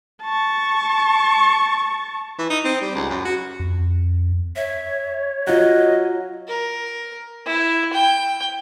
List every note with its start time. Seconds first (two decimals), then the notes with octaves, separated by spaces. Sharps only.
0.23 A5 C#6
2.38 E3
2.50 D#4
2.65 C4
2.81 G3
2.95 C#2
3.10 F#2
3.25 F#4
3.60 F2
4.56 C#5 E5
5.47 F#3 F4 D#5 F#5
6.48 A#4
7.46 E4
7.93 G5